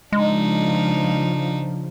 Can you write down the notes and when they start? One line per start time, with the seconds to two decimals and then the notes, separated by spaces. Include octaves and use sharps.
0.12 C#3 F3 G#3 D4 D#4